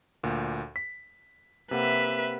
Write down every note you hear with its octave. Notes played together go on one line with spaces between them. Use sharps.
D2 A#2
B6
C3 A#3 B4 E5 F#5